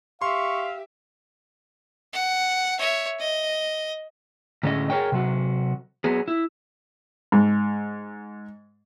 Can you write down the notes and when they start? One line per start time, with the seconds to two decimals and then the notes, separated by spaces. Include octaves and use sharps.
0.22 G4 E5 F5 C6 C#6
2.13 F#5
2.79 C#5 E5
3.19 D#5
4.63 A2 D3 G#3 A3 C#4 D#5
4.90 G#4 A#4 C#5 G5
5.12 C3 F#3 F#4
6.04 F#3 B3 G#4
6.28 E4
7.32 G#2